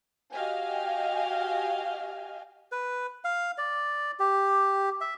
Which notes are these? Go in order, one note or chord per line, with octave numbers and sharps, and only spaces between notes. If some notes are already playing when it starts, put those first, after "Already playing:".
F#4 G4 D#5 F5 G5 G#5
B4
F5
D5
G4
E5